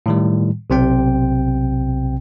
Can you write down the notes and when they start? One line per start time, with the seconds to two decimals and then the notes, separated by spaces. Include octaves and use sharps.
0.06 A2 D#3 G3
0.70 B1 C3 C4 G5